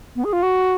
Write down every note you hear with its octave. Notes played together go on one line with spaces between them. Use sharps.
B3
G#4
F4
F#4